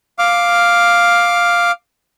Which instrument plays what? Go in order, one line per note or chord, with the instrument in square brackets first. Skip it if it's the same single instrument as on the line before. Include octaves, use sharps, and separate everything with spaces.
[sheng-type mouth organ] F5 D6 F6